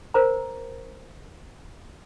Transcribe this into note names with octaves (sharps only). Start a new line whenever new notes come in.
A#4 C5 A#5